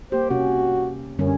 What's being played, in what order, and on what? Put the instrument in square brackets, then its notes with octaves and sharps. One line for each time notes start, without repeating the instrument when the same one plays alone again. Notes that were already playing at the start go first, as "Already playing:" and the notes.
[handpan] A#3 G4 [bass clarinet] C5
[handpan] C3 C#4 [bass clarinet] F#4
[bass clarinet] F#2 [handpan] D3 G3 C#4